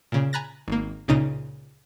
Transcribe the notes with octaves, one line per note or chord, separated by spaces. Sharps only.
A#2 C#3
G#5 A#5 B5 F#6 A6 A#6
G#1 A#3
C#2 A#2 C#3 D#4 A#5 D#7